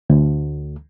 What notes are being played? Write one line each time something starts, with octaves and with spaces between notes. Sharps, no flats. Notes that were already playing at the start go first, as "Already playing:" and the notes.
D2